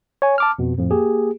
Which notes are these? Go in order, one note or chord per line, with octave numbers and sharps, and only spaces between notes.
C#5 G#5
A5 D6 F6
F2 B2
F2 A2 F3
A#3 G4 G#4